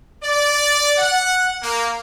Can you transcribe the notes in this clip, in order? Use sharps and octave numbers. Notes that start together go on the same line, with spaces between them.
D5
F#5
A#3